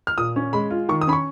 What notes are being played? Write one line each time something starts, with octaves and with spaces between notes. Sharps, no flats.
F6
A#2 D#6
C#4
G#3 B5
F4
D#3 C#6
D#6
C#4 B5
C#6